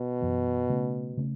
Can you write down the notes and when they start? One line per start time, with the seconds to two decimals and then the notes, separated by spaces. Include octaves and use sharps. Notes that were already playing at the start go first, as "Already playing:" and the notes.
Already playing: B2
0.21 F#2 E3 B3
0.69 C#3 A3 C#4
1.17 C#3 A3 C#4